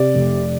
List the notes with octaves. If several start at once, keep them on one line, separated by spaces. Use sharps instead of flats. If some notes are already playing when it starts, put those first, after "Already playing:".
Already playing: C3 D5
F1